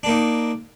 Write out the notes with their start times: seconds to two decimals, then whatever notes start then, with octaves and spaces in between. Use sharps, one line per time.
0.03 D4
0.06 A#3
0.09 D#4